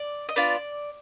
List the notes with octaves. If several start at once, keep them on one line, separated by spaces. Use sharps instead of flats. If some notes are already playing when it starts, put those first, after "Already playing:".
Already playing: D5
D#5
B3 D4 F4 D5